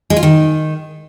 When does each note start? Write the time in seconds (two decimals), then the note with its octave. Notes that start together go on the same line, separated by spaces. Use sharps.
0.10 G#3
0.16 F4
0.23 D#3